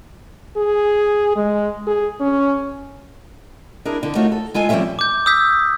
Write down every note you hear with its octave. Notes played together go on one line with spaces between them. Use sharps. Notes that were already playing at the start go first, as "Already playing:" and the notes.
G#4
G#3
G#4
C#4
D4 E4 G#4 A#4
D3
A3 D#4 F4 F#4 A#4 C#5
A4
G#3 F4 A4 G#5
F3 G3 C4 C#4 F4 E5
D6 G6
D#6 E6 G6 B6